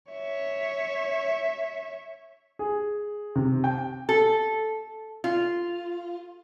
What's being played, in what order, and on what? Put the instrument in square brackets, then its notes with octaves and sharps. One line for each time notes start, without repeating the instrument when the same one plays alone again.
[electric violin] C#5 E5
[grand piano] G#4
C3
G5
[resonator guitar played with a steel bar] A4
F4